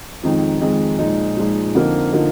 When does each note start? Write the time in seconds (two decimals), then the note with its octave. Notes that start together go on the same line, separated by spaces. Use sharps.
0.23 F2 D#3 G#3 D#4
0.60 F2 D#3 G#3 D#4
0.99 A#2 F3 G#3 D#4
1.37 A#2 F3 G#3 D#4
1.75 F2 D3 F3 A#3 D#4
2.12 D3 F3 A#3 D#4